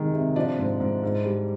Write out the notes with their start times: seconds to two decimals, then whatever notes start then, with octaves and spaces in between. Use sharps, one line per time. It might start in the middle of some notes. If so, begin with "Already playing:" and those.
Already playing: C3 D#3 G#3
0.14 C3
0.36 F3 D4 D5
0.58 G#2
0.80 G#2
1.03 G#2
1.25 G3